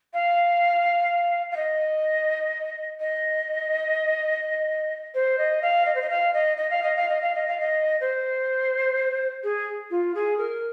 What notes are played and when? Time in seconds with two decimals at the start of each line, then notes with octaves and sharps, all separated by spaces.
0.14 F5
1.51 F5
1.56 D#5
3.00 D#5
5.14 C5
5.38 D#5
5.62 F5
5.86 D#5
5.95 C5
6.02 D#5
6.10 F5
6.34 D#5
6.57 D#5
6.70 F5
6.83 D#5
6.96 F5
7.09 D#5
7.21 F5
7.35 D#5
7.47 F5
7.60 D#5
8.01 C5
9.44 G#4
9.91 F4
10.15 G#4
10.38 A#4